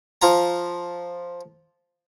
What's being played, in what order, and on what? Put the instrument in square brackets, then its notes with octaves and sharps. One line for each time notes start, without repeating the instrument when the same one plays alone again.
[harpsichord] F3 F4 A#5